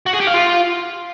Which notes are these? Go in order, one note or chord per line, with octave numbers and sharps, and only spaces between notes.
F#4
G#4
G4
F5
F4